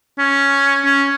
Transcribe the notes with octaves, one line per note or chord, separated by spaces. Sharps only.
C#4
C#4